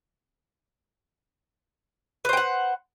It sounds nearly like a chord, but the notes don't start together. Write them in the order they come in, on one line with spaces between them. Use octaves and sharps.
B4 C5 G5 F#5